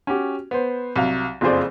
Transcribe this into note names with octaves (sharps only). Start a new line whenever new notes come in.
C#4 F#4 G4
B3 C5
C2 F#3 F5
F#1 F2 F4 G#4 C5 D5